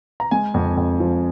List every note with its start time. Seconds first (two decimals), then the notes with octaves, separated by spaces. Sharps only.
0.20 A#5
0.31 G#3 G#5
0.54 F2
0.77 F2
1.00 F3